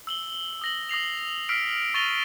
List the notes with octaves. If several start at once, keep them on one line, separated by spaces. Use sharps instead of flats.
E6 F#7 G7
D#6 A#6 F#7
D#6 A#6 C7 F7
E6 F6 B6 C7 D7
C#6 A6 A#6 D#7 F7 G7